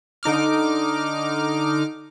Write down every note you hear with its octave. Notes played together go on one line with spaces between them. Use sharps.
D3 D#4 D6 F6